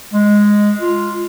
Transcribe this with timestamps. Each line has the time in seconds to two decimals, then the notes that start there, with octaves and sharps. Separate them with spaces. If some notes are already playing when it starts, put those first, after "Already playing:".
0.13 G#3
0.81 F4